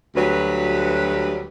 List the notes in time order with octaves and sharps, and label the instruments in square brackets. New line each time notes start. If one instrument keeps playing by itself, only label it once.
[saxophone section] D2 F#3 G3 B4